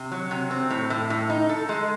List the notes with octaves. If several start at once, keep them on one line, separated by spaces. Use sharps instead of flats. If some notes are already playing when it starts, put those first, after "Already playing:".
Already playing: C3
F#3
C3
C4
A2
A2
A2
D#4
A4
G#3